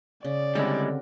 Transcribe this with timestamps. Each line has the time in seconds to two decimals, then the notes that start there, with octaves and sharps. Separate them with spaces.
0.24 C#3 D5
0.55 D3 G3 G#3 C4 E4 G4 A#4 F#5